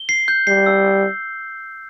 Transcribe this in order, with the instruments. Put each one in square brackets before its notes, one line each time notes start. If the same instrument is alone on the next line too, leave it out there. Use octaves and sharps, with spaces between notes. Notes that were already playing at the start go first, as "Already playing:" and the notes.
Already playing: [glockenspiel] G7
C7
G6
[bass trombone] G3 [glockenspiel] C7
[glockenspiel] E6